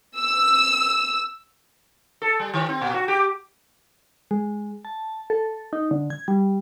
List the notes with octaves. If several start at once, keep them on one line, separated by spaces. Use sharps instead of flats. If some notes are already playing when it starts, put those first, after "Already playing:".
E6
A4
G3
D#3
C4
A#2
F#4
G4
G#3
A5
A4
D#4
D3
G#6
G3